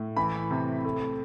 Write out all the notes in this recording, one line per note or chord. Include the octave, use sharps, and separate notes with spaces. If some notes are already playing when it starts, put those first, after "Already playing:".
Already playing: A2
E3 B5
C3
A3